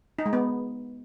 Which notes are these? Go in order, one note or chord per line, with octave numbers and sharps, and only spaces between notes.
D#4
G#3
B3